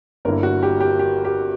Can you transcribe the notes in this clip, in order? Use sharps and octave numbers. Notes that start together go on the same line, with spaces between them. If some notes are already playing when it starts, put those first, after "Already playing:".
G1 G2 D3 A#3 E4 A#4
F#4
G4
G4
G4
G4